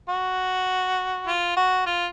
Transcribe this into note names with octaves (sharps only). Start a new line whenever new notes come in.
F#4
F4
F#4
F4